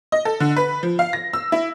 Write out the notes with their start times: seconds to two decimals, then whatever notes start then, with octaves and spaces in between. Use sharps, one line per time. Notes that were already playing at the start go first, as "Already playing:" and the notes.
0.12 D#5
0.25 A4
0.40 D3
0.56 B4
0.83 F3
0.99 F5
1.13 A#6
1.33 E6
1.52 E4